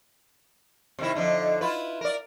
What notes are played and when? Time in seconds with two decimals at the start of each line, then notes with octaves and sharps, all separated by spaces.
0.99 C3 D#3 E4
1.15 F2 D3 D#4
1.61 E4 F4 B4
2.01 A#4 D5